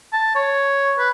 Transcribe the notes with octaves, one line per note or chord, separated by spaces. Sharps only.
A5
C#5
B4